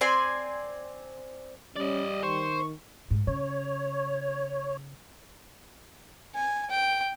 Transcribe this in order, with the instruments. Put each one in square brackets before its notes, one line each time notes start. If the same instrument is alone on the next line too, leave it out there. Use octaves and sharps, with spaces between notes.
[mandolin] C4 D5 G#5 C6
[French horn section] G3 [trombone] C#4 [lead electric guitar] D5 D#5
[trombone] D#3 [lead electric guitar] C5 [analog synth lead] C#6
[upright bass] G#2
[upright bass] C#3 [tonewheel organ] C#5
[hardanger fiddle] G#5
G5